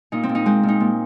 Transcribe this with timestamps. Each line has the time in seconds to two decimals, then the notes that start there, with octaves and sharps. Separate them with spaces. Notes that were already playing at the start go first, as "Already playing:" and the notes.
0.12 A#2 D#4
0.23 C4
0.29 A#2
0.35 D#4
0.46 G#3 C4
0.63 A#2
0.68 D#4
0.80 A#2